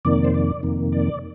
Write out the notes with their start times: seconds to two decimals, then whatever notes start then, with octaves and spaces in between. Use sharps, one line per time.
0.05 F2 C3 D#3 A#3 D5
0.24 C5
0.34 D5
0.63 F2 C3 D#3 A#3
0.92 D5